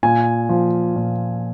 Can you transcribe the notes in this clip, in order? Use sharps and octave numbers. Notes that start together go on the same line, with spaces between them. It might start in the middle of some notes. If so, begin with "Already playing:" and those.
A#2 G#5
F3
A#2